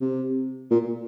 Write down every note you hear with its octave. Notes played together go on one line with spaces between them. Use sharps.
C3
A#2